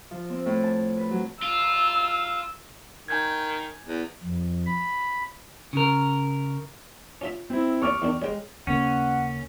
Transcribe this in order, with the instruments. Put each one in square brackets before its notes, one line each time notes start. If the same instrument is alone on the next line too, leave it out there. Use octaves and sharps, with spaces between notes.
[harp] F3
C4
A2
A5
B4
F#3
[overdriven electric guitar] F4 [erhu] E6
[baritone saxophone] D#3 [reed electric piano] G#5 G6 G#6
[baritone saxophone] E2
[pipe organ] F2
B5
[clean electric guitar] C#3 A#4
[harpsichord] C#4 F4 E5
[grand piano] C4 E4
[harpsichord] D#2 C#5 D5 [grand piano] C#6 D6 F6
[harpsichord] E2 D#3 D4
[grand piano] G#3 [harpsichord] C#5 G5
[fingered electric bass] D#2 C#3 A#3 [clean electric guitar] C#4 [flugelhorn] F#5